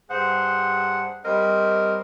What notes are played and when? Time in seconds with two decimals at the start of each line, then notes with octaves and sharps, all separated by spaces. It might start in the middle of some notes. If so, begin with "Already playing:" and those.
0.10 G2 G#4 C5 F#5
1.25 G3 C4 A#4 C5 D#5